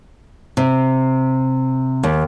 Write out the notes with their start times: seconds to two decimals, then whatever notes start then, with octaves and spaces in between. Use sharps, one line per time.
0.57 C3
2.03 D#2